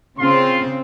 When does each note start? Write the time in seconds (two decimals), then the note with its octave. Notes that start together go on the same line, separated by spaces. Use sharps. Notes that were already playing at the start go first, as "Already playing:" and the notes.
0.19 C#3 C4 F4 C6